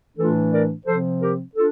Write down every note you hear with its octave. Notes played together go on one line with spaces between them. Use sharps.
A2 E3 A3 D4 F4 A4
A#4 D5
C3 F3 C4 A4 C5
G4 A#4
D4 F4 A4